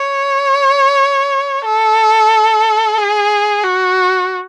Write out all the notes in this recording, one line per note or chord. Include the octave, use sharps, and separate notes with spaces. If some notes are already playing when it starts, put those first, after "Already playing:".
Already playing: C#5
A4
G#4
F#4